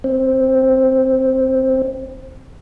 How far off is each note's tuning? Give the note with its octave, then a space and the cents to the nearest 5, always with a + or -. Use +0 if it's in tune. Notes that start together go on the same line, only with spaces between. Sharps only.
C4 +5